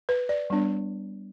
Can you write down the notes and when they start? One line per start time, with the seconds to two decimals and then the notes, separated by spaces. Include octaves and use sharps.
0.09 B4
0.29 D5
0.50 G3 B3 D4